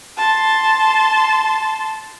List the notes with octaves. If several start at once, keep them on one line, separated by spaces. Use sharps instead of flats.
A5 C6